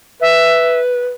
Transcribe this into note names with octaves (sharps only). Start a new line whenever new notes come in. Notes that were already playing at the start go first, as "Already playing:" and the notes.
B4 E5